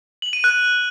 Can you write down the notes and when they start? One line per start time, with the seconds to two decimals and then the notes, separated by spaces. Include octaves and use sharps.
0.22 F#7
0.33 D#7
0.44 F#6